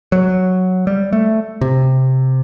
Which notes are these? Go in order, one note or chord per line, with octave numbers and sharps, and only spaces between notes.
F#3
G3
A3
C3